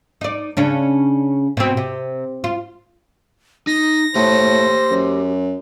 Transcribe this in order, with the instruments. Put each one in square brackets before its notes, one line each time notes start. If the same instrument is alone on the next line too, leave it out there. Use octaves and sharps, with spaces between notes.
[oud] D#4 D5
C#3 C#4 D4
B2 C4
C3
F4
[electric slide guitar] D#4 [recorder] A#6
[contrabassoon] A2 [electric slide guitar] G4 C#5 [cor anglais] C5
[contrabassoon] F#2